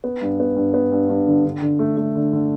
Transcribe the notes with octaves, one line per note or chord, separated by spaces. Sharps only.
B3
G2
B3
G2
B3
G2
G2
D3
D3
D3
A3
A3
D3
D3